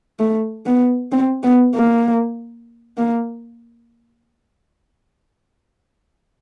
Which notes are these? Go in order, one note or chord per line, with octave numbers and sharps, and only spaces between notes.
A3
B3
C4
B3
A#3
A#3